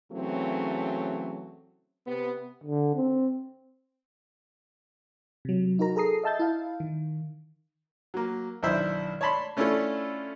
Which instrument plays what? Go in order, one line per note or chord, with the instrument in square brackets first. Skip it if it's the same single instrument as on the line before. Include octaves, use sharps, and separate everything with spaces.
[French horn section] C#3 E3 F#3 A3 C4
C3 B3
[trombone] D3
C4
[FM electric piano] C3 F#3
D#4 F#4 A#4 A#5
G#4 A4 A#5 D#6 C7
D#5 E5 A5 E6 G6 A6
E4 F5
D#3
[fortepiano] F#3 A#3
B1 D#3 D4 E4 C5 E5
C#5 D5 A5 B5 C6
A3 C#4 D4 E4 F4 A4